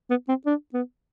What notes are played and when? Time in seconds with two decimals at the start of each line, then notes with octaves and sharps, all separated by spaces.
0.10 B3
0.29 C4
0.46 D4
0.74 B3